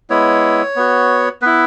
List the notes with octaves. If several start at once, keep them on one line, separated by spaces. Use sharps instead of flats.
G#3 B3 E4 C#5
B3 F#4
B3 E4 B4